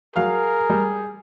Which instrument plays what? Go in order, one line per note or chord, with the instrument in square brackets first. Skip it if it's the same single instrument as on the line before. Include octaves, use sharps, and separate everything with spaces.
[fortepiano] F#3 F5 F6 [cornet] G#4 [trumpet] A#4
[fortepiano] G3